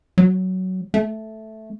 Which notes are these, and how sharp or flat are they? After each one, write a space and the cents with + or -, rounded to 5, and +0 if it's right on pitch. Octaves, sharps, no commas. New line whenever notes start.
F#3 +10
A3 -5